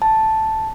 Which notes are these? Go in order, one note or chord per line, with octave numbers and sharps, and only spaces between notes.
A5